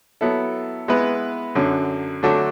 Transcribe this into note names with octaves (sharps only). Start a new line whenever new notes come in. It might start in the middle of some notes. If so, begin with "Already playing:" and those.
F#3 B3 E4 A4
G#3 B3 E4 B4
F#2 D3 F#3
D3 F#3 A3 D4 F#4